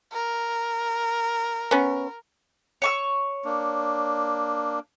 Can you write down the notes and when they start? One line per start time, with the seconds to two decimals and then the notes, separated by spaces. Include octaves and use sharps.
0.13 A#4
1.71 B3 C#4
2.82 C#5 C#6 E6
3.45 A#3 D4